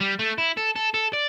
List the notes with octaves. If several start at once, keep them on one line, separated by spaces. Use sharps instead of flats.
G3
A3
E4
A4
A4
A4
D5